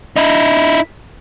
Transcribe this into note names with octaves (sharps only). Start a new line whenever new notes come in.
D#4 E4